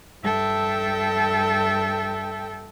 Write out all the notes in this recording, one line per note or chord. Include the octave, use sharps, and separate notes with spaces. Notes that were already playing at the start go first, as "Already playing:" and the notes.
G2 A4 E5 G5 A5